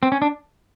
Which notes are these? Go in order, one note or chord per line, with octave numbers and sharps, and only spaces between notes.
C4
C#4
D4